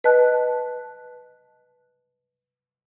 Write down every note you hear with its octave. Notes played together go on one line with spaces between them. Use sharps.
B4 D#5 A5 F#6